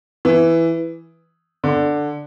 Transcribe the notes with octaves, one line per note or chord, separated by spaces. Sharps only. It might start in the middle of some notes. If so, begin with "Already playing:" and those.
E3
D3